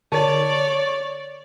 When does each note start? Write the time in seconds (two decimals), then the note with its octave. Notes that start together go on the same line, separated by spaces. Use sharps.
0.12 D3 C#5 D5